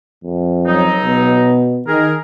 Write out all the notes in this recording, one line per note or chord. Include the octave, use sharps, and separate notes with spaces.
F2
C#2 F#3 D#4
B2
D#3 G#4 A#4